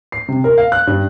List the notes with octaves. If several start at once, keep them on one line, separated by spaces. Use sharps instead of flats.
C7
C3
A#4
F5
F#6
G2